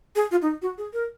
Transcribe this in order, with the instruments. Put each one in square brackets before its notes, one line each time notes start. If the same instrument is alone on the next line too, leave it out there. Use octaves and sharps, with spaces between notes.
[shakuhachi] G#4
F4
D#4
F#4
G#4
A#4